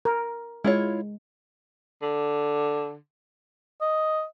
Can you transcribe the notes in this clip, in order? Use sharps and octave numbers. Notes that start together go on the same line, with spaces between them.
A#4
G#3 E4 F4 C#5
D3
D#5